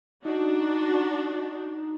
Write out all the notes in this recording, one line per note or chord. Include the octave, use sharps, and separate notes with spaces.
D4 D#4 F#4